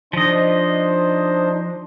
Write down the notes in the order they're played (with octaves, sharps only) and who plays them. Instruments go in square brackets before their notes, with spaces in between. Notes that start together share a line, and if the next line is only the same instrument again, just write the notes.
[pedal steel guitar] F3 D#5 [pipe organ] D4 D#4 C5